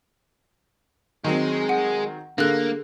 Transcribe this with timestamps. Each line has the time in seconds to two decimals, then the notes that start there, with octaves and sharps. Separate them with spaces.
1.24 D#3 F#3 G#3 C4
1.69 F#5
2.38 D3 A#3 G#4 A4 F#6